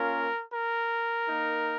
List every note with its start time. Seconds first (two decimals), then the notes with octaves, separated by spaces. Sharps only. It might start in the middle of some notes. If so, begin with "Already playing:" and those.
Already playing: A#3 C#4 F4 A#4
0.53 A#4
1.29 A#3 D#4